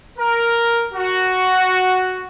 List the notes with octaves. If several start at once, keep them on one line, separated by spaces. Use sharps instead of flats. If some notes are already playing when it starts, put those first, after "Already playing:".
A#4
F#4